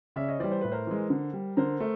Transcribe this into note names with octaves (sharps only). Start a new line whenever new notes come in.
C#3 D5 E5
C#5 D#5
E3 G3 C5 D5
C5
A2 B4
A#4 C5
E3 G#3
D3
G3
D3 A#4 C5
A3